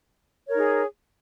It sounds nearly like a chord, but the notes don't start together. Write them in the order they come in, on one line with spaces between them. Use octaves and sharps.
C#5 A#4 D#4 G#4